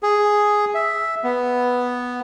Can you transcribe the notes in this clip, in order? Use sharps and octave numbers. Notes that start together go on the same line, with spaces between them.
G#4
E5
B3